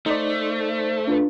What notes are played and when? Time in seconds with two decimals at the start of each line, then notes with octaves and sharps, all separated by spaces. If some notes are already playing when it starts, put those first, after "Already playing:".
0.06 A3 D#4 C5 D5
1.07 D4 F4 B4